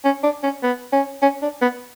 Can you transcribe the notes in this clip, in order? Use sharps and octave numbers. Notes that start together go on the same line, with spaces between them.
C#4
D4
C#4
B3
C#4
C#4
D4
B3